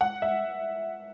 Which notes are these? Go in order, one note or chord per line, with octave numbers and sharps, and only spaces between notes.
F#5
E5